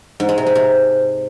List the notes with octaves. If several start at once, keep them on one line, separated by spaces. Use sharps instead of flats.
G#2
G#3
C3
G#3
C3